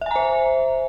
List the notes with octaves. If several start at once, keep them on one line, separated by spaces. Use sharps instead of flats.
C5 E5 G#5 A#5